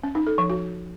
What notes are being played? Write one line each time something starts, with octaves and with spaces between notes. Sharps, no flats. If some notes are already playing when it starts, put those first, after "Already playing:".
C#4
D#4
A4
F3
F#4